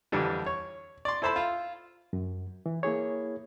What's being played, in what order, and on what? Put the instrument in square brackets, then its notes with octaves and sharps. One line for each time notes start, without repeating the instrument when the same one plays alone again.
[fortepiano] F2 D3 E3 G3 D4
C#5
D5 C6
E4 A4 C5 A5 B5
F4
[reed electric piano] F#2
E3
A#3 E4 G#4 C#5